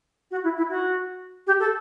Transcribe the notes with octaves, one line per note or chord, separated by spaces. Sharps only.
F#4
E4
E4
F#4
G4
A4